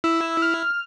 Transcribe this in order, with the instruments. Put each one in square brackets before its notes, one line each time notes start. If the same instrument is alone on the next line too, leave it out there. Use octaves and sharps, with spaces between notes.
[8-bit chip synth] E4 [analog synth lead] E6
[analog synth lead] F6